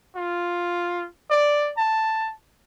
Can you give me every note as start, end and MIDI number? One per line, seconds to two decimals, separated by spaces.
0.16 1.06 65
1.30 1.70 74
1.78 2.32 81